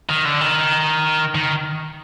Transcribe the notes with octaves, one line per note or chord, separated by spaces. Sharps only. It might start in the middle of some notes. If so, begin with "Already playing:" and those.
D#3
D3
D#3
D#3